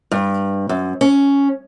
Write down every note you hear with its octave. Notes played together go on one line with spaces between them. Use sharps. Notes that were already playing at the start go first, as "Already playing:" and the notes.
G2
F#2
C#4